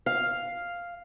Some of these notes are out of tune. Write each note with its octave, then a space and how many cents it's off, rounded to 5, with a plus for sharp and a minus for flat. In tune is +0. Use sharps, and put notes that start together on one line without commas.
F5 +0